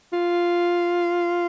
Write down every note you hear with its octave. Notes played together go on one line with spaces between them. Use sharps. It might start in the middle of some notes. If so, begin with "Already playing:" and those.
F4